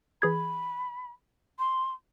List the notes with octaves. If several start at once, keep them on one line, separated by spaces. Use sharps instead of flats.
E3 G#4 B5 G#6
C6